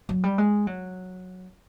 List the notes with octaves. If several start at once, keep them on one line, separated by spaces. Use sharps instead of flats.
F#3
G3
G#3
F#3